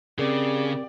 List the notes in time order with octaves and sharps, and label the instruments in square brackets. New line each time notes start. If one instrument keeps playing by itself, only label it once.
[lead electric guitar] C#3 [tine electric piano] C4 A#4 [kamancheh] G4 D5 [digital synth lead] G#4